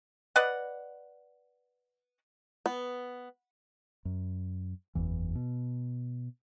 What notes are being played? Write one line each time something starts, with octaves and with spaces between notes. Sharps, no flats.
B4 D5 D#5 F#5
B3
F#2
F#1 E2 E3
B2